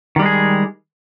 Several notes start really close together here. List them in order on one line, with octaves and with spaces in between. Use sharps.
D#3 G3 G#3 G#4